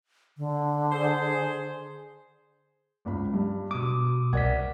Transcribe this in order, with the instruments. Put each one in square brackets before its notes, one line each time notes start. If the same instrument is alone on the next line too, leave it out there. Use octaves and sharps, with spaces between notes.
[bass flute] D3
[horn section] G#4 C5
[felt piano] G#1 C#2 B5
G2
[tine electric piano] B2 D6 [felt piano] D#6
[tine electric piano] C2 D5 B6 [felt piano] A#4 F#5 G#6